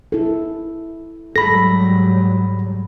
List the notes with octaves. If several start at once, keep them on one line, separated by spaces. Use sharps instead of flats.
E4 A4
G#2 F#3 G3 A4 B5 A#6